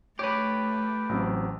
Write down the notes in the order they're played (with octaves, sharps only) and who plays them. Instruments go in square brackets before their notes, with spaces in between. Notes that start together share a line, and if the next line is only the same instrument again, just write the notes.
[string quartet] A3 [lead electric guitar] G4 B4 [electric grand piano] C#5 D6
[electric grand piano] A1 F#3 C4